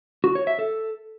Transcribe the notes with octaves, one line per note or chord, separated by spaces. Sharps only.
F#4
C#5
E5
A4